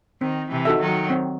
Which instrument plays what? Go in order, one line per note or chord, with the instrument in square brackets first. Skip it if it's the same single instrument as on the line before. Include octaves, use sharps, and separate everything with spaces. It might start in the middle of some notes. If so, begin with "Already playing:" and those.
[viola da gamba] D#3 [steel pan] C4
[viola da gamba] C3 E3
[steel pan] D#4 F#4 A4 E5
[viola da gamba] D#3 F#3
[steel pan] C4